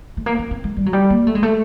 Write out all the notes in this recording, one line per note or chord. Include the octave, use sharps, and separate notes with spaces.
A3
A#3
C#4
C4
G#3
G3
F#3
G3
A#3
A3
G#3
A3